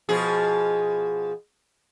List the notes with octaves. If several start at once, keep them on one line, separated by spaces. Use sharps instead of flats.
B2 F3 G#4